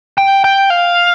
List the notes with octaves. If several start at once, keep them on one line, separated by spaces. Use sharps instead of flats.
G5
G5
F5